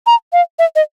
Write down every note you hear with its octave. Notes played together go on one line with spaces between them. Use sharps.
A#5
F5
E5
D#5